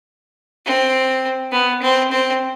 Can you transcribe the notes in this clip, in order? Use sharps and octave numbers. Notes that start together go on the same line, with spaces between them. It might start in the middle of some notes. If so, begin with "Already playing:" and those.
C4
B3
C4
C4